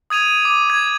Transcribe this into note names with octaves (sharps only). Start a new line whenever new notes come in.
D#6 G#6 D#7 F7
D6
G#6